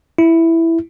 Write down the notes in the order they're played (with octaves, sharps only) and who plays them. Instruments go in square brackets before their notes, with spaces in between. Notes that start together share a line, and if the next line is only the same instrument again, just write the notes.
[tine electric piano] E4